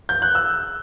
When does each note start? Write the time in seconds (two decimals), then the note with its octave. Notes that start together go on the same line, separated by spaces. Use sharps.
0.09 G6
0.22 F#6
0.35 E6